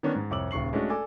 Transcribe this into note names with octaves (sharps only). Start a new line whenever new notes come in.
D#3 B3 C#4 D4
G#2
C2 F2 C#5 D6 E6 F#7
D#1 C#3 C#6 C7 F#7
G#3 A3 C#4 D4 F#4
A4 D5 G#5 D6